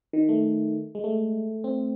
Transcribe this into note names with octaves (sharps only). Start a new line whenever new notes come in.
D#3
A3
G#3
A3
C4